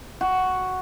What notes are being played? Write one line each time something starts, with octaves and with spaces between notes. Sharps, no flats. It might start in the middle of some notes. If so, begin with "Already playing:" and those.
F#4